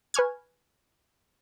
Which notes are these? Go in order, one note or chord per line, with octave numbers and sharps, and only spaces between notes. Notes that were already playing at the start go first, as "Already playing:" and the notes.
B4 G#5 C#6 F6 G#6